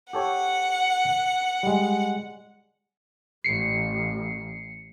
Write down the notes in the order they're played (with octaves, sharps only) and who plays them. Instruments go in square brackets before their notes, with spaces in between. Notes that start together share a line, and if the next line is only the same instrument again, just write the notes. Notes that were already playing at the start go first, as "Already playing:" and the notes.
[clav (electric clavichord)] G4 A4 C#5 [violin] F#5
[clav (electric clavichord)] G3 G#3
[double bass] A1 [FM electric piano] C7 C#7